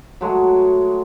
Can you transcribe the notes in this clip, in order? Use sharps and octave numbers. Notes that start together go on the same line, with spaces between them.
F#3 G#3 A3 F#4